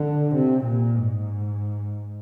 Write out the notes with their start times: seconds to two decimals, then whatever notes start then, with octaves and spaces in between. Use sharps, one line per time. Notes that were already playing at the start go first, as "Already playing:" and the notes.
Already playing: D3
0.35 C3
0.64 A#2
0.95 G#2